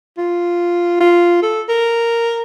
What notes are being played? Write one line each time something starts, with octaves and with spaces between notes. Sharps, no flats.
F4
F4
A4
A#4